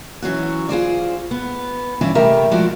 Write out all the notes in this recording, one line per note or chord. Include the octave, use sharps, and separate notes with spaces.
E3 F#3 C#4 F#4
F4 G#4 C5 D5
B3
G2 E3 C#4 E4 D5
C3 G3 A3 G4 A#4 E5
F3 G#3 A3 E4 F#4 D5